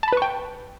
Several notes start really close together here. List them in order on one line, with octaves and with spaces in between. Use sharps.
A5 B5 B4 C#6 G5